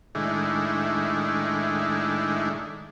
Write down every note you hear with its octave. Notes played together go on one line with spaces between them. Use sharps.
A2 D#3 G#3 D4 E4